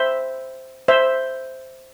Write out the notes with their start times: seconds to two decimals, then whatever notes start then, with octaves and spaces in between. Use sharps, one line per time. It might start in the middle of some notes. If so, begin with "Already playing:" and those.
Already playing: C5 E5
0.88 C5 E5